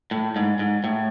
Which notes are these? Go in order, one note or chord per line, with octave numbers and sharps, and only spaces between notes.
A2
G#2
G#2
A2